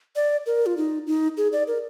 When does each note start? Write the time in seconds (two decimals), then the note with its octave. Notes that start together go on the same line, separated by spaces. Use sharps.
0.16 D5
0.46 A#4
0.66 F4
0.77 D#4
1.07 D#4
1.37 G#4
1.53 D5
1.67 A#4